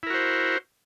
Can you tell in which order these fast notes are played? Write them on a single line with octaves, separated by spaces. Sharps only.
E4 A#4 F#4 C5